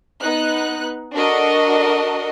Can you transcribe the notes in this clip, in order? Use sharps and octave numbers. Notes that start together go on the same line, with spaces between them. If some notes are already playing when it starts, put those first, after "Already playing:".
B3 D#4 F#6
D4 F#4 A4 A#4 D#5